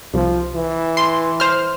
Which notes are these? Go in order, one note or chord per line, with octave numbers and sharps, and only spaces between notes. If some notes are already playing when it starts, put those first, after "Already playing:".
C2 F3
E3
C6
C5 F6